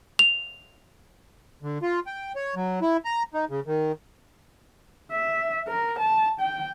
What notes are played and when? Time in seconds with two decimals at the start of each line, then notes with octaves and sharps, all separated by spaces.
0.19 F7
1.63 D3
1.82 F4
2.07 G5
2.36 C#5
2.56 F#3
2.82 E4
3.05 A#5
3.34 D#4
3.50 C#3
3.66 D#3
5.12 E5
5.68 A#4
5.99 A5
6.41 G5